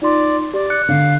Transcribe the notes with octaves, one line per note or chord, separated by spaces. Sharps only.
D#4 F4 D5 C6
G4 D5
F#6 C#7
D3 F5